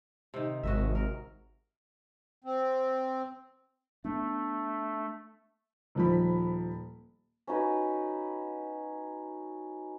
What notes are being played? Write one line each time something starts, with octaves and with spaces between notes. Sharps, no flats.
C3 D#3
G#1 F#4 D#5 E5
A#4
C4
A3 B3 D4
D#1 F3 B5
C#4 D#4 F#4 B4